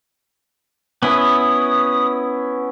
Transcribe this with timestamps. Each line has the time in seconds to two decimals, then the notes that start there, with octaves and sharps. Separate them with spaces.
1.03 B3 C#4 E4 D#6